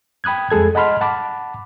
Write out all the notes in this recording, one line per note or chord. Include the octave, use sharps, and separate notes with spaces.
G5 B5 D#6 F#6 G#6
F2 G#3 G#4 A4 G#6
D#5 F#5 A5 B5 C6 F6
F#5 A5 B5 D6